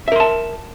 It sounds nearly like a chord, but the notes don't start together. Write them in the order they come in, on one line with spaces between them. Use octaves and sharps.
E5 A#4 C6 A5